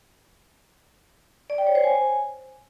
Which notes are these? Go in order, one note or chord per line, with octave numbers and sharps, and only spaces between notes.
D5
G5
C#5
C5
G#5